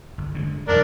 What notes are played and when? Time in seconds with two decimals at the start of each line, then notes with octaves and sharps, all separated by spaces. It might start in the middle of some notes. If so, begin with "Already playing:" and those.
0.18 G1
0.35 D3 F3 G#3
0.68 E1 F#2 B2 D4 A#4